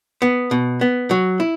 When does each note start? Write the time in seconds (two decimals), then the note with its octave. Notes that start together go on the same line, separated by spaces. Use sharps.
0.22 B3
0.51 B2
0.81 B3
1.11 F#3
1.40 E4